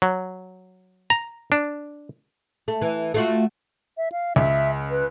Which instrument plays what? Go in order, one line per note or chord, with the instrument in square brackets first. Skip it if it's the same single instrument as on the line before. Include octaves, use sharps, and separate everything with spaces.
[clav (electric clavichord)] F#3
A#5
D4
[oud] A3
E3
A3 F4 F#4
[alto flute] E5
F5
[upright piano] C#2 [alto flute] E5
[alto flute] B4